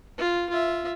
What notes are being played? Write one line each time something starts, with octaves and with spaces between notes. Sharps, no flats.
F4
F4 E5